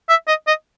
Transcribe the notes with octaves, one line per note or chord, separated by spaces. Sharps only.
E5
D#5
D#5